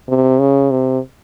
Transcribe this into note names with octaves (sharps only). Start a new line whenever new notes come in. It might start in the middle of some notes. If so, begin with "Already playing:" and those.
C3
C#3
C3